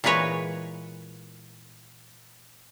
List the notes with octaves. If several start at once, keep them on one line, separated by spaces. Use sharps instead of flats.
A#2 E3 G#3 B4 C#5